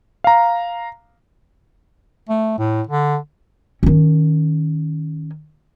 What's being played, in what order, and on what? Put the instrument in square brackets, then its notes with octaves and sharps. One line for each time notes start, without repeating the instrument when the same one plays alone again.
[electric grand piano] F5 A#5
[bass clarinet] A3
A2
D3
[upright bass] D#3 C#4